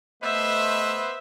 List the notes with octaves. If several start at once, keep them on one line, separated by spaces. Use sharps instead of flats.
A3 B3 B4 C5 D#5 E5